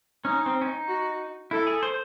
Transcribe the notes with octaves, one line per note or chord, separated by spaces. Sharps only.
C#4 D#4
C4
C#4
D#4
F#4
E4 A4
G#4
C5